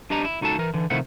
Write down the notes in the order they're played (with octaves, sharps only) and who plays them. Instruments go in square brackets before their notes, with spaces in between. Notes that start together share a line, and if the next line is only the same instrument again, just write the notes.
[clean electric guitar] D4 G4 D#5 A#5
E4
C#2 D#4 F#4 A4 A5
E3 A#4
D3 E3
C3 D#3 F3 A3 E4 F#5